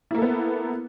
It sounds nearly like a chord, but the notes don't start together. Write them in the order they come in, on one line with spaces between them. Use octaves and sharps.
E4 A#3 A4 B3